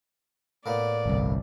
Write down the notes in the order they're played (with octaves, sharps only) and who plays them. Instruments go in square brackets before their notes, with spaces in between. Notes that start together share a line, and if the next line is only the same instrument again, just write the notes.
[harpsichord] A2 A#3 B3 [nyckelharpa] D5
[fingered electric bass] G1 C2